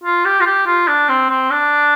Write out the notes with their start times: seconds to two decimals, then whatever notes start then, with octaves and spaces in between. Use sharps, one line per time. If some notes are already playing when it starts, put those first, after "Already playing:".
0.03 F4
0.25 G4
0.41 F4
0.46 G4
0.67 F4
0.88 D4
1.09 C4
1.30 C4
1.51 D4